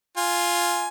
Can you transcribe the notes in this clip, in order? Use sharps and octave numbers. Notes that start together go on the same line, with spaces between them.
F4 G#5